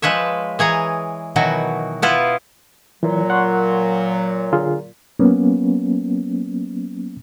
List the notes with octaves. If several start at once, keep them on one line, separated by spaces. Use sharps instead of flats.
F3 G#3 B4 C#5 E5
E3 G#4 C#5 A#5
B2 D#3 E3 F#3 F#4
B3 E4 F4 B4
A#2 E3 F#3
F#5 C6 C#6
D3 F4 G#4
F#3 A#3 B3 C#4